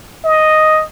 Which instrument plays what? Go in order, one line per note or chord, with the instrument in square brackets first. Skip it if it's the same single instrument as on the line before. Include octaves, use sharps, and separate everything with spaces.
[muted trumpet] D#5